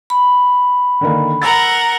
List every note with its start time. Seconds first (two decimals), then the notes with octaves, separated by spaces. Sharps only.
0.10 B5
1.01 D3 D#3 A#3
1.42 A#4 F#5 A#5 E6 A6